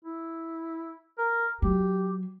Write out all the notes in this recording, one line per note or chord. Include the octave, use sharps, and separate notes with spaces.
E4
A#4
F#3 G4